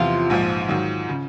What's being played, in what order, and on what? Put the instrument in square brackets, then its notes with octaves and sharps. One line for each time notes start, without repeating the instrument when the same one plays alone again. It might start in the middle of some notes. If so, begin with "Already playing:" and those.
Already playing: [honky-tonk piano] E2 C3 F3 [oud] F4
[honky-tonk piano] A#1 G#2 F3
G#2 D#3 F#3
C#3